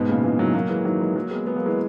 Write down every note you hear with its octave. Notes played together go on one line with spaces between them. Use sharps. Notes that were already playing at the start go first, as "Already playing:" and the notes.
Already playing: G#2 B2
A#2 C#3
C#3 E3
D#3 F#3
F#3 A#3
E3 G#3
D#3 F#3
E3 G#3
F#3 A#3
G#3 B3
G#3 B3
F#3 A#3
E3 G#3